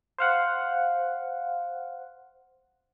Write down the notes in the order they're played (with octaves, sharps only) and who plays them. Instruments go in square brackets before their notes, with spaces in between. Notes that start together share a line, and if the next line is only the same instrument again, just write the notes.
[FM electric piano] C5 F5 F#5